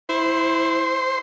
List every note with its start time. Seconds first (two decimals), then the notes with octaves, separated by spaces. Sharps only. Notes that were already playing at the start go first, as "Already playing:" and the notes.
0.09 E4 C5